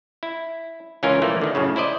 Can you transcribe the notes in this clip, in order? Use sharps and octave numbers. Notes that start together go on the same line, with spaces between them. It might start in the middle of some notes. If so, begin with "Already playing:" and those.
E4
C#2 E3 C#4 F4 A#4 G#5
A#2 E3 F3 A3 A#3
D3 D#3
F#2 A2 C#3
E4 C5 D5 D#5